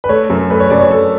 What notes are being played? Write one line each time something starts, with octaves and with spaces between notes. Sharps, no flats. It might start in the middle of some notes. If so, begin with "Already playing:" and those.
B4
A3 C#5
F#2
A3 B4
C#5
F#2 D5
C#5
F#2 A4